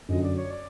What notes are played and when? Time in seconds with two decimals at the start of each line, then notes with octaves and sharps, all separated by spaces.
0.08 F#2 D3 F#3 D#5
0.23 D5
0.37 C#5
0.51 D5